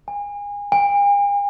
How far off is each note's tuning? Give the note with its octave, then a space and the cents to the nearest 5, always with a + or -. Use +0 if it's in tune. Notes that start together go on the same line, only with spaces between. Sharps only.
G#5 -30
G#5 -45